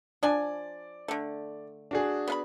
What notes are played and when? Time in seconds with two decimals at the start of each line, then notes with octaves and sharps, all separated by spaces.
0.23 F3 D4 D5 G#5
1.08 D3 A3
1.91 D4 F#4 G#4
2.28 B3 F5 B5